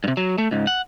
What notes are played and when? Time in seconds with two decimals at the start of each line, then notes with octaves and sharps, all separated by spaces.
0.04 G2 C3
0.17 F#3
0.38 A3
0.51 C#2 G#2
0.67 F#5